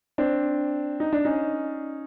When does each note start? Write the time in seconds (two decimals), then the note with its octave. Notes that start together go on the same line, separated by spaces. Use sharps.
0.18 C4 D4
1.00 D#4
1.13 D4
1.25 C#4 D#4